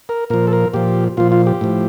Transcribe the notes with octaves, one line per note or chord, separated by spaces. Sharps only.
A#4
A#2 F3 A#4
A4
A#4
A#2 F3 G4
A#2 F3 F4
F4
G4
A2 F3